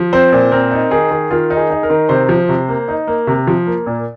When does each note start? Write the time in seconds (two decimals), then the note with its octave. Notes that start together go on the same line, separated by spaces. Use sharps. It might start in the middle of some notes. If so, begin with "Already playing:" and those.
Already playing: F3
0.13 C4 C5
0.32 A#2
0.52 C4 A#4
0.71 D#4
0.91 D#3 G#4
1.11 D#3
1.31 D#3 F4
1.50 D#4
1.57 G#4
1.70 D#4
1.83 A#4
1.90 D#3
2.09 C3 C5
2.29 F3
2.49 C3
2.68 A#3
2.88 D#4
3.07 A#3
3.27 C3
3.47 F3
3.66 A#3
3.86 A#2